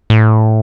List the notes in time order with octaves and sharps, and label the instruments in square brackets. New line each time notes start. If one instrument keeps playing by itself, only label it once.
[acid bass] A2